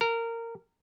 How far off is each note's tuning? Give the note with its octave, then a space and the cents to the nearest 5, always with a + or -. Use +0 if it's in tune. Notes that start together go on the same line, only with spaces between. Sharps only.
A#4 -20